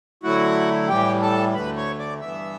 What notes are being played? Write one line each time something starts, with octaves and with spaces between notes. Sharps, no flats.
D3 F#3 A3 E4 F#4 F#5
A2 E3 G3 G4 G5
A4 A5
D2 D3 A3 B4 B5
C#5 C#6
D5 D6
G2 E3 B3 E5 E6